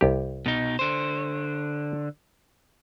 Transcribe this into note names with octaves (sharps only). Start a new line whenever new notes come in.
C2 G4
B2 D#4
D3 C5